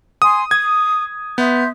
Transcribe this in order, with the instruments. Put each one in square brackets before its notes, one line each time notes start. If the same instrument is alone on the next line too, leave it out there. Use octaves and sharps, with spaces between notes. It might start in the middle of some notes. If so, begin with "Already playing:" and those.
[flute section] G#5 C6 [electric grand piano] D#6
[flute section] D#6 [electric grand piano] G#6
[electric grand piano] B3 [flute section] E5 C6 G6